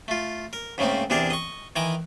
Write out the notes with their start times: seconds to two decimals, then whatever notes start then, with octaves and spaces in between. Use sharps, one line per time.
0.08 A3 F4
0.53 A#4
0.78 G#2 C#3 A3 A#3 C4
1.10 E2 C3 D4 G#4 A#4 D5
1.30 D#5 C#6
1.76 D#3 E3 G#5 A#5 D6